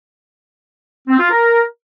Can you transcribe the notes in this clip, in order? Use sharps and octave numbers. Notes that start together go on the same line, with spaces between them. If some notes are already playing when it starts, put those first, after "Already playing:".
C4
F4
A#4